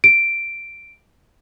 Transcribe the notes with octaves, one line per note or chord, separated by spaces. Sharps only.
D7